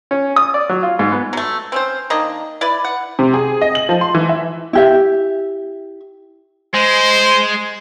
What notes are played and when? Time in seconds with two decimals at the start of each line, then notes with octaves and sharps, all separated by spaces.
0.11 C#4
0.36 D#6
0.54 D5
0.69 F#3
0.83 F4
0.99 G#2
1.12 B3
1.33 F#3 A3
1.72 C4 C#4 C5
2.10 D#3 A#3 D4 D#5
2.61 E4 B4 D5
2.84 F#5
3.19 C3
3.34 G#4
3.61 D#5
3.75 F#7
3.89 F3
4.01 C6
4.15 E3
4.29 E5
4.73 E4 G4 E5
6.74 G#3 C5